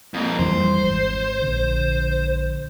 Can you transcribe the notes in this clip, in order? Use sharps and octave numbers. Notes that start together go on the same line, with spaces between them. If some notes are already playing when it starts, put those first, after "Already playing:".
F2 A#3
F2 E3 G3 C5
G#1
A#1 D3